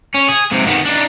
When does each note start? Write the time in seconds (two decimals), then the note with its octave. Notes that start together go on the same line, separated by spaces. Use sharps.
0.15 C#4
0.29 G#4
0.52 G#2 C3
0.66 D#3 B3
0.85 D4 D#4